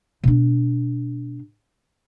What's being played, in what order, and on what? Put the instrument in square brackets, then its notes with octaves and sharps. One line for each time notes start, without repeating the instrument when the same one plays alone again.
[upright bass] B2 D4